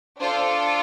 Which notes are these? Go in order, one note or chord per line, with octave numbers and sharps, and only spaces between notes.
D4 F4 A4 C5